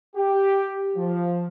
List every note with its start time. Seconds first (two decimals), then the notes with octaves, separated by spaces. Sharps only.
0.16 G4
0.96 F3